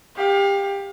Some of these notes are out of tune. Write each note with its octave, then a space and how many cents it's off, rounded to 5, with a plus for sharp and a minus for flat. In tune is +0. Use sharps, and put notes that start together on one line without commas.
G4 +20 F5 +30